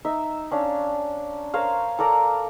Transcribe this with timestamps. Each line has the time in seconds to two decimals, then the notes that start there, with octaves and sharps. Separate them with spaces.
0.05 D#4 E5
0.51 C#4 D4 F5
1.54 A#4 C5 C#5 F5
1.99 A4 A#4 D5 A#5